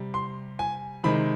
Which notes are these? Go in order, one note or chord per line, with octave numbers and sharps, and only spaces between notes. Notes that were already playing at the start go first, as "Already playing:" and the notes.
Already playing: C3 G3
C6
G#5
C3 D#3 G#3 B5